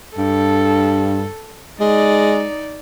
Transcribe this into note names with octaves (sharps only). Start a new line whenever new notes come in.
G2 A4
G#3 D#4 D5